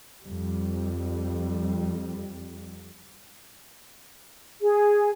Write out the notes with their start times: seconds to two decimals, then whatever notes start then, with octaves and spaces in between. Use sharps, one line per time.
0.22 F2 G3
4.62 G#4